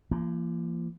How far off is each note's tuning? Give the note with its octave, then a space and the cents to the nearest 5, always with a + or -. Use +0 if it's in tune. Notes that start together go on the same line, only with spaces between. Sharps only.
F3 -45 A#3 +0